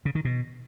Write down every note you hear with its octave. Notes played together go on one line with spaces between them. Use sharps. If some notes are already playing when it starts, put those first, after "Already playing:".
C#3
D#3
B2